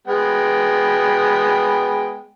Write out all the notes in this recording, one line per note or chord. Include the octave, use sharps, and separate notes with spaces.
G#3 B3 G5